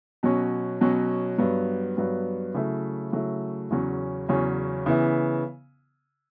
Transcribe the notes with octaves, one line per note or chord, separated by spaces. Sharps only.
B2 F#3 C#4
B2 F#3 C#4
G2 F#3 B3
G2 F#3 B3
C#3 F#3 A3 E4
C#3 F#3 A3 E4
E2 C#3 F#3 C#4
E2 C#3 F#3 C#4
C#3 E3 B3 E4